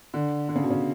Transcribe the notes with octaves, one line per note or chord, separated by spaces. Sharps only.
D3
D3
C#3
B2
C#3